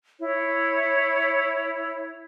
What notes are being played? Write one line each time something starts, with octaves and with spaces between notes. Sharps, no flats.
E4 C#5